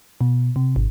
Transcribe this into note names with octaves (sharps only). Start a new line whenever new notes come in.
B2
C3
G#1